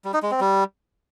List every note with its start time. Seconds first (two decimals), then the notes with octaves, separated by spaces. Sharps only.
0.04 G3
0.13 D#4
0.22 G#3
0.31 C4
0.40 G3